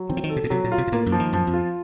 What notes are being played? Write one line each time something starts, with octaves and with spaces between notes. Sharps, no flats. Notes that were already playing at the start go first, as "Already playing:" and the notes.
Already playing: F#3
D#3 C4
F3
D#3
A4
C3
A#2
C3 F#3
A#2
F4
C3
A#2
A2 A#3
F#2
F3
D#3
F#2 F3
F2
F4